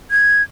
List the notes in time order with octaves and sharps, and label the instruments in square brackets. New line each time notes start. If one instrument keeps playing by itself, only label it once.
[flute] G#6